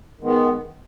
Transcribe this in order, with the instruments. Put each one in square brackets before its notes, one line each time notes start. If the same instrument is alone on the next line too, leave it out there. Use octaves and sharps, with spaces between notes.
[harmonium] D#3 G#3 B3